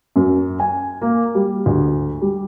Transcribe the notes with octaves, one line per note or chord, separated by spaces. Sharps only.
F#2
G#5
A#3
G3
D2
G3